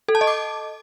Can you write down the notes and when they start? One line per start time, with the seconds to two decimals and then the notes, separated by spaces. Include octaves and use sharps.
0.08 A4
0.15 A5
0.21 D#5
0.27 D6